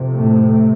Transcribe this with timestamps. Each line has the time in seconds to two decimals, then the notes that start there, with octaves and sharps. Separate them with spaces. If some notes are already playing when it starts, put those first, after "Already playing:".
Already playing: F2 C3
0.17 A2 A3